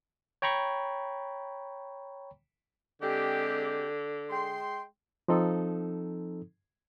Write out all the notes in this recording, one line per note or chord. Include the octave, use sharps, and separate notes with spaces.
C#5 G5 A#5 B5 C#6
D3 G#3 C4 G4
G#3 G5 C6
F3 C4 D#4 A4